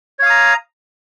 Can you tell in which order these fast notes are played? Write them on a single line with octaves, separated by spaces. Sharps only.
C#5 F5 D#6 A#5